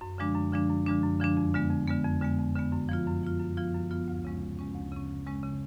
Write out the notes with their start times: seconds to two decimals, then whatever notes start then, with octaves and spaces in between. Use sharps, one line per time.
0.01 F#2
0.18 D3 F3 G#3 D4
0.35 F#2
0.52 D3 F3 G#3 D4
0.69 F#2
0.86 D3 F3 G#3 D4
1.03 F#2
1.20 D3 F3 G#3 D4
1.37 F2
1.54 D3 G#3 B3
1.71 F2
1.88 D3 G#3 B3
2.05 F2
2.22 D3 G#3 B3
2.39 F2
2.56 D3 G#3 B3
2.72 F#2
2.89 F3 B3 F4
3.06 F#2
3.23 F3 B3 F4
3.40 F#2
3.57 F3 B3 F4
3.74 F#2
3.91 F3 B3 F4
4.08 D2
4.25 C#3 G#3 C#4
4.42 D2
4.59 C#3 G#3 C#4
4.75 D2
4.92 C#3 G#3 C#4
5.09 D2
5.26 C#3 G#3 C#4
5.43 C#3